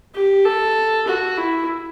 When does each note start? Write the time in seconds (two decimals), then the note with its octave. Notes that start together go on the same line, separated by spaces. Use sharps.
0.15 G4
0.45 A4
1.08 F#4
1.37 E4